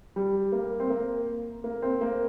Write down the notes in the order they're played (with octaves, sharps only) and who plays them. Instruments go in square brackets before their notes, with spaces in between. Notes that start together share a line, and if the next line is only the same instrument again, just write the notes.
[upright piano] G3
A#3
C4
A#3
A#3
C4
A#3